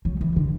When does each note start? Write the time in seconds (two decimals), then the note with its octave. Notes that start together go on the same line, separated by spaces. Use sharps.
0.05 F#3
0.21 E3
0.36 D3